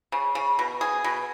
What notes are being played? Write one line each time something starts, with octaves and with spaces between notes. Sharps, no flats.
C#3
C#3
B2
G#4
B2